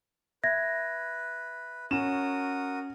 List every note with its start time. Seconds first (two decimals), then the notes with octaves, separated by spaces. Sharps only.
0.44 B4 E5 G#6 A#6
1.91 C#4 F#4 A#4 D#6 E7